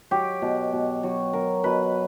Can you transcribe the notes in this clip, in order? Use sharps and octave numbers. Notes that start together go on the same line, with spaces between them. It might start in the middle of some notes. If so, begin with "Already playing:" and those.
F#3 G4
B2
B2
F#3
F#3 A#4
B2 B4